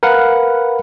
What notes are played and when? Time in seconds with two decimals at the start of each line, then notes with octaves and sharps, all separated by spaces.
0.03 A#4 B4 F5 F#5